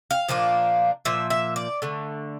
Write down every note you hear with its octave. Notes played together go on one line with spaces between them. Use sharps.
F5
A#2 F3 A#3 D4
A#2 F3 E5
E5
D5
D3 A3